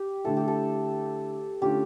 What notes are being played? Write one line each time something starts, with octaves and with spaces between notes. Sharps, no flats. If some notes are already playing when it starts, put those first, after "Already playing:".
Already playing: G4
D3 A3 E4 A4
G4
A4
D3 A3 C#4 F4 G4